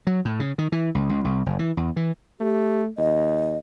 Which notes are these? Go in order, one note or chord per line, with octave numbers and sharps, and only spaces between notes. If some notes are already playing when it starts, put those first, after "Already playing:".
F#3
A2
C#3
D#3
E3
C#2
C#2
C2
F#1
E3
E2
E3
A3 G4
D#2 D#5